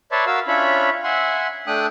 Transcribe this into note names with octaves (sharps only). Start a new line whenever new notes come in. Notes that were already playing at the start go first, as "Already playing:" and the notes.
B4 C#5 D5 E5 A5 C6
F#4 A#4 F5 E6
C#4 D4 F4 C#5 E5 B5
E5 F#5 G#5 C6
A3 D4 G5 D#6 F#6